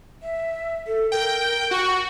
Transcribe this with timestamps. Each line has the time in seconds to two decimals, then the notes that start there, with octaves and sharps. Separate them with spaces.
0.23 E5
0.87 A4
1.12 A#4 G5
1.71 F#4 C#6